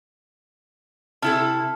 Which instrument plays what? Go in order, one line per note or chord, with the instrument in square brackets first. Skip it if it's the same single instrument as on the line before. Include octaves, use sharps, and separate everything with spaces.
[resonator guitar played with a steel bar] C3 E4 A4 [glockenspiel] A5 F6